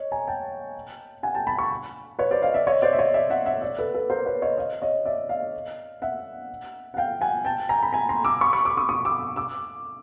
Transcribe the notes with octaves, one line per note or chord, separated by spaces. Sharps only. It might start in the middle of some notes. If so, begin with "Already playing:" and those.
Already playing: C#5 D#5
G#5 A#5
G5 A5
F#5 G#5
G5 A5
A5 B5
B5 C#6
B4 C#5
C5 D5
D#5 F5
D5 E5
C#5 D#5
C5 D5
E5
C#5 D#5
D5 E5
E5 F#5
E5 F#5
D5 E5
A4 B4
A4 B4
A#4 C5
B4 C#5
C#5 D#5
D#5 F5
C#5 D#5
D5 E5
D#5 F5
E5 F#5
F#5
F5 G5
F#5 G#5
G5 A5
G#5 A#5
B5
G#5 A#5
A#5 C6
D6 E6
B5 C#6
B5 C#6
D6 E6
C#6 D#6
C#6 D#6
D6 E6
D6 E6